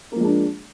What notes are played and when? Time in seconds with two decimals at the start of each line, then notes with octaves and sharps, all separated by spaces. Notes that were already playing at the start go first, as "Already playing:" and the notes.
0.12 A#3
0.16 F3
0.20 G#3
0.25 D4